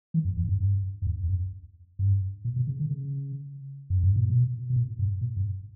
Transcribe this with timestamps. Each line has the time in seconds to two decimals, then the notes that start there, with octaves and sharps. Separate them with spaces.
0.14 E3
0.25 F#2
0.36 E2
0.44 G2
0.49 F#2
0.60 G2
1.02 F#2
1.07 E2
1.24 E2
1.30 F#2
1.99 G2
2.45 A#2
2.56 B2
2.67 C#3
2.79 D3
2.91 C#3
3.90 F#2
4.03 G2
4.16 A#2
4.30 B2
4.70 B2
4.76 A#2
4.99 G2
5.21 A#2
5.37 G2